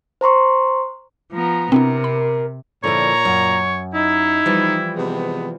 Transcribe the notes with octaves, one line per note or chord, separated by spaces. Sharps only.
C5 A#5 C6 C#6
F3 B3 A#5
C3 C4 D4 E4 A#4
B5
A#2 D3 F3 E4 C#5 A#5
F#2
D#4 E4
E3 F3 G3
C3 G#3 B3